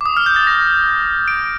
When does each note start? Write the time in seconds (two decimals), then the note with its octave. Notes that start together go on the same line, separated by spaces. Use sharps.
0.01 D6
0.06 D#6
0.17 F6
0.26 G6
0.36 A6
0.47 A#6
1.28 D7